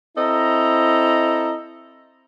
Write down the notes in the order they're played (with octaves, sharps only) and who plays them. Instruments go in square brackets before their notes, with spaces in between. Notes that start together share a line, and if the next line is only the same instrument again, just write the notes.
[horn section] C4 E4 A4 D#5 A#5